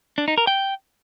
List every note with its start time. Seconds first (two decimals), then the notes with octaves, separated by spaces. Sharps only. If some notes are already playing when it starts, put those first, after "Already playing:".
0.18 D4
0.28 D#4
0.38 A#4
0.47 G5